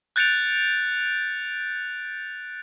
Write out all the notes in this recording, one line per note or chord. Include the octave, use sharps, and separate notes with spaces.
F#6 G6 A6 C#7 D7 F7